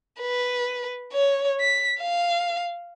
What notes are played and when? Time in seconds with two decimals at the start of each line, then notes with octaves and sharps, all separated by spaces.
0.21 B4
1.13 C#5
1.61 B6
2.01 F5